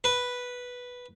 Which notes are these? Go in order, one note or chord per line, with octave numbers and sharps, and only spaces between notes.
B4